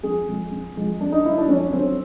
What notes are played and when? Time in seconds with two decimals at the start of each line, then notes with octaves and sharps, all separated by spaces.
0.03 F2 G#4
0.28 C3 F3 G#3
0.51 F2
0.76 C3 F3 G#3
1.00 F2 D4
1.12 D#4
1.25 D3 F#3 E4
1.38 D4
1.49 F2 C#4
1.73 D3 F#3 C4